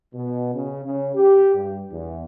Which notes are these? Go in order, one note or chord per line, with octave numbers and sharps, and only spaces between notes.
B2
C#3
C#3
G4
G2
E2